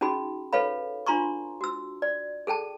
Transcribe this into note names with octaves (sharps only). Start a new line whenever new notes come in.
C#4 D#4 F#4 G#4 B5
A4 B4 C#5 F5 B5
D4 F4 A#5 C6 C#6
F#4 E6
D5
G#4 A4 G5 A5